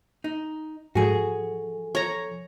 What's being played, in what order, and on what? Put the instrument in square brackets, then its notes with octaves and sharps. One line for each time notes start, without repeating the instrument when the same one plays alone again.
[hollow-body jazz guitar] D#4
[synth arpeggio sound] G#2 [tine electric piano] F3 A4 G#5 [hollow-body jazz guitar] F#4 G#4
[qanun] C#5 A#5